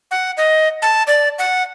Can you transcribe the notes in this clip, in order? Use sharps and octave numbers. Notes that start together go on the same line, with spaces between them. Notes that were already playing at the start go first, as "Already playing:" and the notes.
F#5
D#5
A5
D5
F#5